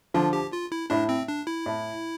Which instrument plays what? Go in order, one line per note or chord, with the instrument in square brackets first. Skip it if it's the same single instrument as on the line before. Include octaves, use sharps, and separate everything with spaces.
[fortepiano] D3 F3 [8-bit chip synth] F4
[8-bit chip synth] G4
F4
E4
[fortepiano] A2 [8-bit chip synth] D4
[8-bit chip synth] C4
D4
E4
[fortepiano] A2